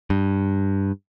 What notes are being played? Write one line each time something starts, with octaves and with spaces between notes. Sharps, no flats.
G2